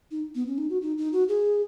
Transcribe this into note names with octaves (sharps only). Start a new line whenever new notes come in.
D#4
B3
C#4
D#4
F#4
D#4
D#4
F#4
G#4